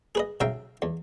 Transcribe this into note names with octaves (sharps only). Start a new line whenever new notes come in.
G#4 B4 D#5
B1 C#3 E5 F5 G5 A#5
E2